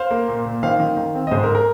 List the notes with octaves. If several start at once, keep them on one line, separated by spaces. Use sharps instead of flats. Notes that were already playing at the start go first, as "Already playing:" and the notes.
Already playing: C5 F5
A#3
A#2
A#2
D#3 C5 F5
D#3
D#3
C4
D#5
G#2 G#4 C5
A#4
A#4